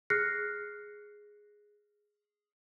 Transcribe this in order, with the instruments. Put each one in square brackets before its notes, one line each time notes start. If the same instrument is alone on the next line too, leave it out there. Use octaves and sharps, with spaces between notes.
[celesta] G#4 F6 F#6 A#6 C7 C#7